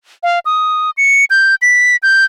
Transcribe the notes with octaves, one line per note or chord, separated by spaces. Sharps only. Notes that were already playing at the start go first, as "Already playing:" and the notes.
F5
D#6
C#7
G6
B6
G6